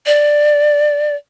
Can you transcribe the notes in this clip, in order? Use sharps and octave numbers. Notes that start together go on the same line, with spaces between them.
D5